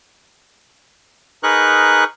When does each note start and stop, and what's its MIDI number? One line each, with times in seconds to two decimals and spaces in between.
1.43 2.04 63
1.43 2.04 68
1.43 2.04 70
1.43 2.04 71
1.43 2.04 85
1.43 2.04 90